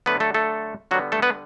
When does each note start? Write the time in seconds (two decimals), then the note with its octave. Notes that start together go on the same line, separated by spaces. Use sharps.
0.06 D3 F#3 A3 B3 B4
0.20 A3 A4
0.34 A3 A4
0.91 D3 F#3 F#4
0.94 G3 B3
1.12 A3 A4
1.22 B3 B4